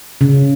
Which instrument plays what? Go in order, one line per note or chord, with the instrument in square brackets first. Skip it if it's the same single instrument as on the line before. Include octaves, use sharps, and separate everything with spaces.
[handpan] C#3